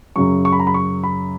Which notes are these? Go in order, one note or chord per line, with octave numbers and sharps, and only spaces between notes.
F#2 C#3 F#3 C#6
C#6
B5
A#5
B5
C#6
B5